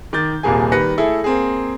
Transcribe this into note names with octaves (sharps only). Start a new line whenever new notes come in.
D#3 D6 G6 A6
D#1 C2 A#2 A#3 G#4 G#5
D#3 G3 B4 A#6 C#7
A3 E4 G#4 A4
A#3 C4 G#4